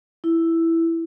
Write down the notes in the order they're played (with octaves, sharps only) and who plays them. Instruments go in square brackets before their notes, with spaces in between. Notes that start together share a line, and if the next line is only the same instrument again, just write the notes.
[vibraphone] E4